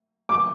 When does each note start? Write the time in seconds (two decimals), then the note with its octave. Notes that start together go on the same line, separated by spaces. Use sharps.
0.29 D6